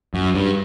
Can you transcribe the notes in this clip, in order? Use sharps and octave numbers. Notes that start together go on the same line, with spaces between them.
F#2
G2